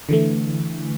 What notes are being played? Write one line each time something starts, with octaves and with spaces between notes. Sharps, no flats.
D3 E3 A3